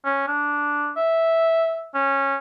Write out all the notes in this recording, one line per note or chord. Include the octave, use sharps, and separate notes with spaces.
C#4
D4
E5
C#4